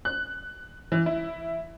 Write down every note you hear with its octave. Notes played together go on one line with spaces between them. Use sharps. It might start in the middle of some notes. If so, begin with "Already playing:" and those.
F#6
E3
E4